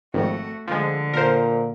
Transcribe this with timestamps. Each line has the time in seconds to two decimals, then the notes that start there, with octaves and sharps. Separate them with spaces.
0.14 G#1 F2 A3 F#4
0.68 D3 F3 G#3
1.14 A#2 A#4 C5